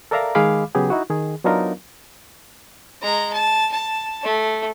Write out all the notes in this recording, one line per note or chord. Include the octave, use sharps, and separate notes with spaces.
A4 A#4 D5 E5 F5 A#5
D#3 G#3 G#4 F5 B5 D6
C#3 F#3 B3 G4 G#4
D#4 E4 F#4
D#3 G#4
F#3 B3 D4 D#4 F4 A#4
G#3 A#5
A5
A5
A3